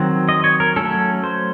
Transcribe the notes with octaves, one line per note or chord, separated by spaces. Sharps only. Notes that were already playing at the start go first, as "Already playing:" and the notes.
Already playing: D#3 F#3 C4
D#5
C#5
A#4
F#3 A3 C#4 A4
C5